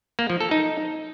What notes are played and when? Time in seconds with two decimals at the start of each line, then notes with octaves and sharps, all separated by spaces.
0.19 A#3
0.30 F3
0.40 A4
0.51 D#4